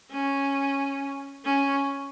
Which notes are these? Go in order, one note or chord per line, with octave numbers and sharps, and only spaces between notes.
C#4
C#4